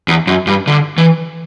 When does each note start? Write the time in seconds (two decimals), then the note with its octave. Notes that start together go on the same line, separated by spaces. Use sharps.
0.08 E2
0.27 F#2
0.47 G2
0.67 D3
0.98 E3